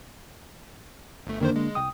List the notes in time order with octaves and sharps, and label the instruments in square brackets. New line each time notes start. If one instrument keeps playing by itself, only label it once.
[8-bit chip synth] G1 A3
[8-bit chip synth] F2 D#3 C5 [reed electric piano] D3 A#3 D4
[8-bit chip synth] G#3
[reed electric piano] C2 G5 D#6